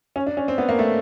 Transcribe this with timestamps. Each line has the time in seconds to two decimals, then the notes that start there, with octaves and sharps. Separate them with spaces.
0.16 C#4
0.27 D4
0.37 C#4
0.48 C4
0.58 B3
0.69 A#3
0.79 A3